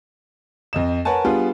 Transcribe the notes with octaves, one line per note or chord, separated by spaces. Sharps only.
F2 D#5 E7
A#4 B4 C#5 F#5 G#5 A5
G3 B3 D4 F4 G#4